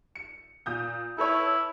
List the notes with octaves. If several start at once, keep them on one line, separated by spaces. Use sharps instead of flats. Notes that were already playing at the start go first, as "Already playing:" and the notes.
C#7
A#2 D#6 G6
E4 A4 B4 C#5